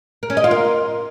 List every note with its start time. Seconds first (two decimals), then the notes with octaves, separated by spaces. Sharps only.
0.23 A#4
0.30 C#4
0.37 D#5
0.44 F4
0.51 A#4